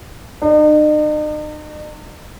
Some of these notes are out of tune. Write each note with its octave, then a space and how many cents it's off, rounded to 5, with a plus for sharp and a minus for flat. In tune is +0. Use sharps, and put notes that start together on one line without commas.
D#4 -45